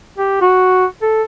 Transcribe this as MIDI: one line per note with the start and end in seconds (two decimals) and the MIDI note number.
0.18 0.38 67
0.41 0.85 66
1.02 1.22 69